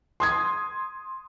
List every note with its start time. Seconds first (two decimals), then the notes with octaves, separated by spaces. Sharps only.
0.20 C6 D#6 G#6